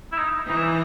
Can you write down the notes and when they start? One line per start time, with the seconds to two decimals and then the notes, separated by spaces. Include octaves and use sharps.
0.12 E4
0.18 D#4
0.47 E3 D#4
0.56 E4
0.66 D#4